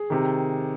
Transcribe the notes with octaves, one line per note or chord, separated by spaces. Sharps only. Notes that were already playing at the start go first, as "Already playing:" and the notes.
Already playing: G#4
C3 D#3